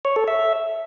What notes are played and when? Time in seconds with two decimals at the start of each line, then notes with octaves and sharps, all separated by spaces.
0.05 C#5
0.16 A4
0.28 E5